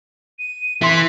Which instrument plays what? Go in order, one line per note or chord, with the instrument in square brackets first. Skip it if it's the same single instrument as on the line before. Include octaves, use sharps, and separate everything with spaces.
[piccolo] D#7
[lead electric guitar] E3 [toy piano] E5 C6 [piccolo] B6